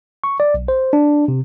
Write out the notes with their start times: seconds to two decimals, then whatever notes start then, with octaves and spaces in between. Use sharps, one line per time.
0.24 C#6
0.40 D5
0.54 B1
0.68 C5
0.93 D4
1.28 C3